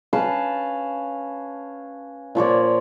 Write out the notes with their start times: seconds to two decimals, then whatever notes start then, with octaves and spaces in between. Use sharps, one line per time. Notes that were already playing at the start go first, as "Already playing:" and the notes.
0.13 C#4 B4 F5 A5
2.35 A#2 F3 C#5 D5